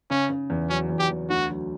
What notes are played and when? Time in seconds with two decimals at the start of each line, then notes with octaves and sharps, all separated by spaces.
0.11 C#3 C#4
0.30 C#3
0.50 E2
0.70 F#3 C#4
0.89 E2
0.99 G4
1.10 E2
1.30 D2 F#4
1.49 F#3